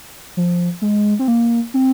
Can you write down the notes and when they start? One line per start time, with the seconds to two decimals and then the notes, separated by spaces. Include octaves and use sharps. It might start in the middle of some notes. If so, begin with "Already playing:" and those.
0.37 F3
0.82 G#3
1.19 C4
1.28 A#3
1.74 C4